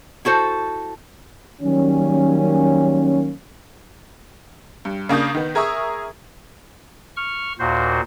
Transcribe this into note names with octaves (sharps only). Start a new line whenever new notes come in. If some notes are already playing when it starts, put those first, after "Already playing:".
E4 F#4 A4 C5
D#3 F#3 G3 A#3 C#4
G2
C#3 A#3 D4 D#6 G6
D#3 B3
G#4 A#4 E5 C#6 D#6
C#6 F6
D#2 A#2 F#4 C5